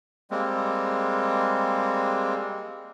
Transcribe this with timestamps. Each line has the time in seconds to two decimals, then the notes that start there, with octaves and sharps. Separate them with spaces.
0.31 G3 G#3 A#3 C4